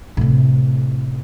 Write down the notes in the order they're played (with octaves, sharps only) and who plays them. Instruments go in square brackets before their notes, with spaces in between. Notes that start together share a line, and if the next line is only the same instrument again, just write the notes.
[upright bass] A2 C3